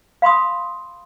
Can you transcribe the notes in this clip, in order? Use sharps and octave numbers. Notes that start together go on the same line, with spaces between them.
F5 B5 C6 D#6